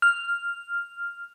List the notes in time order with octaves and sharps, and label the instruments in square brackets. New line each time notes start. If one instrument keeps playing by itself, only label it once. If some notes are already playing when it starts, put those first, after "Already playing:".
[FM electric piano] F6